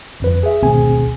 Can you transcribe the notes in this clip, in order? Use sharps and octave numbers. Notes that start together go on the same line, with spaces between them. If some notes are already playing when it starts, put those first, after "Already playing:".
G1 F2 B4
G#4 E5
G#1 D2 B2 C4 G#4 G#5